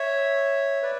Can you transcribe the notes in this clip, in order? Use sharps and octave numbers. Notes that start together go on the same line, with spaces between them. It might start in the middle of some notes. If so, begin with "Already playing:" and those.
Already playing: C#5 E5
B4 D5